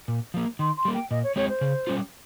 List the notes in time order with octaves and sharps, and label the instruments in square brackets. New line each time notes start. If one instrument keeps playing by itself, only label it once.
[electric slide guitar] A#2
F3 A#3
[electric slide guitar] D#3 [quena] C6
[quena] C6
[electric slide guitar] G3 A#3
[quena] G5
[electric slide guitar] A#2 [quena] D#5
[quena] C#5
[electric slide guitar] G#3 C4 G4 [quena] C#5
[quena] C5
[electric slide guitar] C#3
G3 C#4 F4